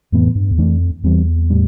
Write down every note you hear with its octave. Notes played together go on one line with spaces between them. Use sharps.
F2 A2 E3 B3
G2
E2
F2 E3 A3 D4
E2 E3 G3 C4
A2 G3 D4